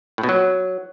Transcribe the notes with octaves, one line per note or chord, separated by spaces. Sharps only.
A2
B2
F#3